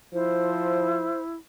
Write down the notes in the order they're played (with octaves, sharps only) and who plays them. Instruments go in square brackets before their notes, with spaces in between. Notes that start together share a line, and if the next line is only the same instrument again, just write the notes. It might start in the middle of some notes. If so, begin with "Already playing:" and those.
[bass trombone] F3 [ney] E4 [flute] C5